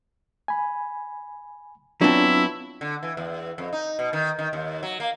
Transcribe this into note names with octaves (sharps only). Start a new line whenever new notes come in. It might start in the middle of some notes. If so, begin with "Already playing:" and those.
G#5 B5
F#3 B3 C4 D4 E4 F4 A5
D3
E3
E2
F2
D#4
B2
D#3
D#3
D#2
F#3
A#3